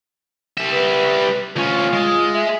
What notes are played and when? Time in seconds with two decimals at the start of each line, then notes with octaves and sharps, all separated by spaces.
0.57 G3 E5
0.71 B4
1.56 D2 C#4 F4
1.93 G#3
2.33 E5